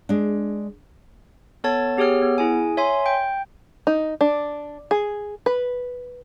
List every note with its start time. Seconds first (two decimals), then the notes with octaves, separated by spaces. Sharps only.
0.09 G#3 D4
1.64 B3 A4 C#5 A5 G#6 A6
1.97 B3 G4 G#4 C#5 F6
2.22 B3
2.38 E4 G#4 G#5
2.77 C#5 E5 G#5 C6
3.06 G5 G6
3.87 D#4
4.21 D4
4.91 G#4
5.46 B4